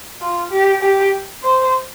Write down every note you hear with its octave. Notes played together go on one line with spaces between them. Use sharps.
F4
G4
G4
C5